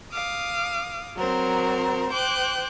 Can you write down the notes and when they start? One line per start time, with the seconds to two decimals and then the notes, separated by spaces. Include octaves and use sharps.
0.12 F5 D6 D#6
1.17 F#3 C4 A#4 C5
2.12 C5 G5 D6 F#6